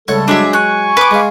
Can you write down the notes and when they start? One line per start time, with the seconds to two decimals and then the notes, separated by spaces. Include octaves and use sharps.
0.08 C#2 G3 A3 A4 C#5 F#5
0.28 F#3 G#3 D4 G#4 E5
0.53 G#5 C#6 F#6
0.97 B4 D6
1.11 G#3 F5